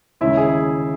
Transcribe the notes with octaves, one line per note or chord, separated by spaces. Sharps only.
D#2 C#3 G#3 E4 E5
G#4